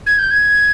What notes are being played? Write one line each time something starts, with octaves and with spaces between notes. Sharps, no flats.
G#6
G6
G#6